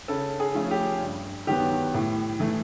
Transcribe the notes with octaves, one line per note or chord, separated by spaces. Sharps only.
C#3 A4
G#4
F3 A3 C#4 F4
G4
G2
D#3 F#3 B3 G4
A2
E3 A3